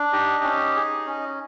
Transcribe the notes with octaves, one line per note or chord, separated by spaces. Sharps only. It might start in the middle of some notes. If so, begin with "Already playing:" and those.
Already playing: D4
D#4 G4 D#5
C#4
G#4
C#4